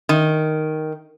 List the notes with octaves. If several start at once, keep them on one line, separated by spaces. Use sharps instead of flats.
D#3